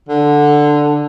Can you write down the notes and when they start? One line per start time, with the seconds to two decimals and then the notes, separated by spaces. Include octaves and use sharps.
0.09 D3